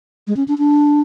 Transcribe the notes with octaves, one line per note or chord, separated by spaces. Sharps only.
G#3
C#4
D4
D4